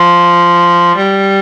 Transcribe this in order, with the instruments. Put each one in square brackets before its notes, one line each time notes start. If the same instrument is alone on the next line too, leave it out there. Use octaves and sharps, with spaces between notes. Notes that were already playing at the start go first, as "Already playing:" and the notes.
Already playing: [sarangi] F3
G3